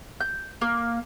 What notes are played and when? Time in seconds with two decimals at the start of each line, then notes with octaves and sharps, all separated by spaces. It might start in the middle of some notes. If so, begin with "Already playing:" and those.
0.21 G6
0.61 A#3